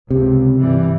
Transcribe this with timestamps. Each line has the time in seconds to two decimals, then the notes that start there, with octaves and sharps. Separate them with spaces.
0.10 C#2 C3
0.60 G1 E3 G3